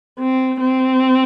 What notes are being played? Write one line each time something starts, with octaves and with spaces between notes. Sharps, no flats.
C4
C4